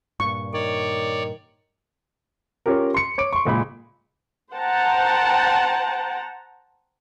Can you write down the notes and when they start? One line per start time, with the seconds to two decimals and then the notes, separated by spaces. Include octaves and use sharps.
0.20 G2 A#2 C#6
0.54 D#3 C#5 D5
2.66 C#4 F4 G4 A#4
2.94 C6 C#7
3.18 C#5 D6 D7
3.33 C6 C#6
3.45 F#1 A#2 G#3 B5
4.54 C5 F#5 G5 A5 A#5